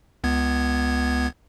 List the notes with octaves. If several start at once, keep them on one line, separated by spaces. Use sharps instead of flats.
C#2 B3 G#6